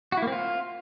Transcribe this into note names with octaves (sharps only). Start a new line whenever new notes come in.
F#4
E4
A#3
C4
F4